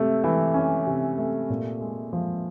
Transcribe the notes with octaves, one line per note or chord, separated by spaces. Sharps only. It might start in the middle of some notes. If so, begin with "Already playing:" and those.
Already playing: C3 A3
E3
C#4
C3
A3
A#2
G#3
F3